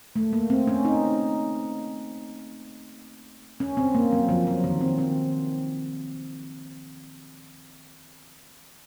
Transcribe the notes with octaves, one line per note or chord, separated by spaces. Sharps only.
A3
A#3
C4
C#4
D#4
C#4
C4
A#3
F#3
F3
F#3
D#3
C4
C4